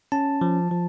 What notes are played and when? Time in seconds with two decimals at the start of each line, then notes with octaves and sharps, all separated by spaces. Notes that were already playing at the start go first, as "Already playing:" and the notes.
0.12 C#4 A5
0.41 F3
0.71 F3